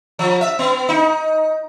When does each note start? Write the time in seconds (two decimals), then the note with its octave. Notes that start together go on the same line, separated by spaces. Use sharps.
0.19 F3
0.41 E5
0.59 B3
0.89 D#4